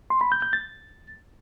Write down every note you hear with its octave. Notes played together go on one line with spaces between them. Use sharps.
C6
B5
G6
G6
A6